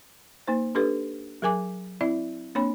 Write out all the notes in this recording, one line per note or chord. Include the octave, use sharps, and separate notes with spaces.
A#3 D#4 C5
D4 G4 A4 B4
F#3 G#4 A#4 G#5 D6
C4 E4 D5 E5
A#3 C4 D4 C#5 B5